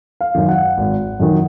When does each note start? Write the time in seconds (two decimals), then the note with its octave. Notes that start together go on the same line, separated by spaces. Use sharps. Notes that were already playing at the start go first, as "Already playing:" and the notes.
0.21 F5
0.35 F#2 D#3
0.49 F#5
0.78 G#1
1.20 F#2 D#3